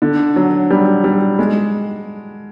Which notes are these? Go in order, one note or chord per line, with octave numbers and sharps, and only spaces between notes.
D3
F#3
G3
G3
G#3